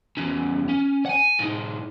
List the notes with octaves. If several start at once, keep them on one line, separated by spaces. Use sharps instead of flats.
E2 C#4
C#4
F#5 G#5
A2 D#4